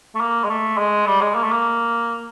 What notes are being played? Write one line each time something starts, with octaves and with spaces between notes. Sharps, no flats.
A3
A#3
G#3
A3
G#3
G3
G#3
A#3
A3
A#3